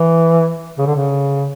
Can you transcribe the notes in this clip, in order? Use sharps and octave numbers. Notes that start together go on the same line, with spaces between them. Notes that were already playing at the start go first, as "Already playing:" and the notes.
Already playing: E3
C#3
D3
C#3